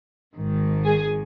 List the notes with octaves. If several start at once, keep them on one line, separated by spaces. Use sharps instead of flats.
G#1 G#2 D#3
G#4 G#5